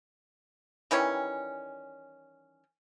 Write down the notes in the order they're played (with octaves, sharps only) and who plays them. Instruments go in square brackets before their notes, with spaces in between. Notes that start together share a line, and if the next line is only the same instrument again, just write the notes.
[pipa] D#3 E3 G3 C#4